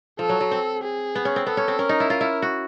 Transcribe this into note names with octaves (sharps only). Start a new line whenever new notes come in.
F3 A4
F#3
F#3
C4
G#4
B3
C#4
C4
B3 A4
C#4
C4
C#4 A#4
D#4
E4
F4
E4
F#4